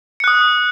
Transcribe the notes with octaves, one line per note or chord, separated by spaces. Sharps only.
D#6 F#6 C#7